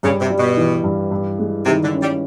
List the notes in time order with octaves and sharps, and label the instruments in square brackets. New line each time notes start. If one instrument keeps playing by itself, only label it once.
[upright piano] G2 [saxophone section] C#3
[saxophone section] C3
[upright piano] G3
[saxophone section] B2
[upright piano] E3
G2
G2
G#3
[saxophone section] C3 [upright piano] D#3
[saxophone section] D3
[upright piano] C#4
[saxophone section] G3